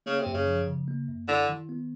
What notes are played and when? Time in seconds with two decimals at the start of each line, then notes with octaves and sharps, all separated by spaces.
0.06 C#3 A#3
0.20 C3
0.26 F#2
0.34 C#3
0.48 F3
0.68 C#3
0.88 A#3
1.08 F#2
1.28 D3 E4
1.49 D#3
1.69 B3